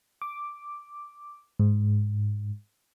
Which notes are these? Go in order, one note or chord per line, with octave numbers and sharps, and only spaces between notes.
D6
G#2